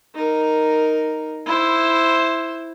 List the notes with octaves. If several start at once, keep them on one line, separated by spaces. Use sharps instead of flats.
D#4 A#4
E4 C5